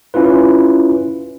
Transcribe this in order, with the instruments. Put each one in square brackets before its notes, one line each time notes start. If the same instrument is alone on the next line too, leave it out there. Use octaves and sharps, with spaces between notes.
[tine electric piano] C#4 E4 F4 B4